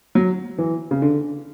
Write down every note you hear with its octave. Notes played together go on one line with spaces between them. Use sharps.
F#3
E3
C#3
D3